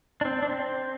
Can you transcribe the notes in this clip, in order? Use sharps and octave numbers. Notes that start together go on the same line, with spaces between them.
D4
C4
D4
C4